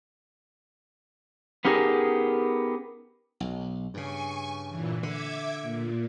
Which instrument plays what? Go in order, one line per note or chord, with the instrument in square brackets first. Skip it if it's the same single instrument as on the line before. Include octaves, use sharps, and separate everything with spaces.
[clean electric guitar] B3 C#4 D#4 G4 G#4 A#4
[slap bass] B1
[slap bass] G2 C#3 [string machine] G#5 C#6
[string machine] A#2 E3
[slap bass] D3 [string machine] E5 D6 G#6
[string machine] A#2